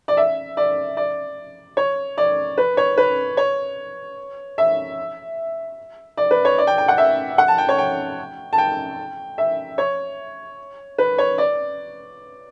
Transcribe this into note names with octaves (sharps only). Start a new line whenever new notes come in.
D5
E5
D5
D5
C#5
D5
B4
C#5
B4
C#5
E5
D5
B4
C#5
D5
G5
G5
F#5
E5
F#5
A5
G5
C#5
G5
A5
G5
E5
C#5
B4
C#5
D5